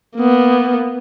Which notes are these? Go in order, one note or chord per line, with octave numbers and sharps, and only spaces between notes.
A#3 B3